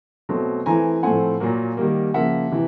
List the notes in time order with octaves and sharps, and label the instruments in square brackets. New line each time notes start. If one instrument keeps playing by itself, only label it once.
[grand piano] B2 F#3 A3 C4
E3 A3 C4 G#5 A#5
A2 F3 A3 C4 F#5 G#5
A#2 F#3 A#3
D#3 G3 A#3
C#3 F3 A#3 E5 F#5
C3 E3